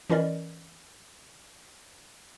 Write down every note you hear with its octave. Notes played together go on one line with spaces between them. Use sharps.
E3 C#4 E4 A#4 D5 D#5